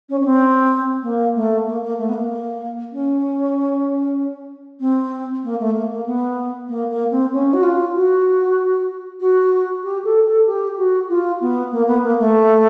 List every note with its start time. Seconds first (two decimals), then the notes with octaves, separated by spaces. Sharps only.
0.09 C#4
0.20 C#4
0.25 C4
1.03 A#3
1.35 A3
1.66 A#3
1.82 A#3
1.98 A3
2.09 B3
2.13 A#3
2.92 C#4
4.80 C4
5.44 A#3
5.59 A3
5.75 A#3
5.90 A#3
6.06 B3
6.69 A#3
6.90 A#3
7.11 C4
7.32 C#4
7.53 F#4
7.63 F4
7.95 F#4
9.20 F#4
9.83 G4
10.04 A4
10.25 A4
10.46 G4
10.77 F#4
11.09 F4
11.40 B3
11.71 A#3
11.87 B3
12.02 A#3
12.19 A3